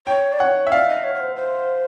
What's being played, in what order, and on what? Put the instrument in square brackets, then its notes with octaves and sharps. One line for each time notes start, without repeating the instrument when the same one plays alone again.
[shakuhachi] C#5 [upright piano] G5
[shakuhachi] D5
[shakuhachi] C#5 [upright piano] F#5
[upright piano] E5
[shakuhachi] D5 [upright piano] F5
[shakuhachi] D#5
C#5
C#5
C5
C5